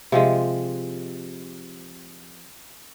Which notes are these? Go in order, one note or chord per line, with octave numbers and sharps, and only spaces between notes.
C3 F3 G#3